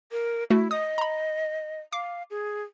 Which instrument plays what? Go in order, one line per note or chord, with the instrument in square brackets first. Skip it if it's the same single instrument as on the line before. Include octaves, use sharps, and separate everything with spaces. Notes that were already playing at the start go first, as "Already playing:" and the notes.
[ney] A#4
[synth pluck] A3 F#4 [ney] E4
[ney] D#5 [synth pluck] D#6
[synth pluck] A#5 B5
[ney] F5 [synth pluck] D6 C7
[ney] G#4